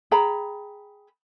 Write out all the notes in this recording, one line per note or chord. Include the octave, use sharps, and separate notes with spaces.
G#4 G5 A#5 B5